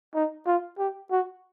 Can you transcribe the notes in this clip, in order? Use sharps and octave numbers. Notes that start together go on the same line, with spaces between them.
D#4
F4
G4
F#4